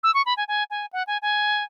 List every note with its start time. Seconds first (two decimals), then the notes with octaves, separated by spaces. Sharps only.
0.03 E6
0.14 C#6
0.26 B5
0.37 G#5
0.48 G#5
0.70 G#5
0.93 F#5
1.07 G#5
1.22 G#5